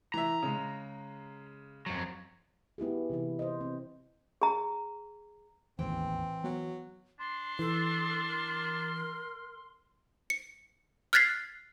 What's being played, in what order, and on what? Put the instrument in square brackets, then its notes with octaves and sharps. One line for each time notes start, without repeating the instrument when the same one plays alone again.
[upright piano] E3 E5 [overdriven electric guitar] A#5
[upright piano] C#3 G#3
[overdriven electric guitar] F2 F#3
[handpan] B3 E4 G4 G#4
C3 E3 E4
C5 D#5
C4
[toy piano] G#4 A#5
[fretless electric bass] E1 A1 D#2 [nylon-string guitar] E3 G5 [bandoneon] C4
[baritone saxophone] F#3 [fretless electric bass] B3
[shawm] D4 [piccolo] C6
[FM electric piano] E3 [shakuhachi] A4
[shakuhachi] A#4
[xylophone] C#7
F6 F#6 G#6 A6 B6 C7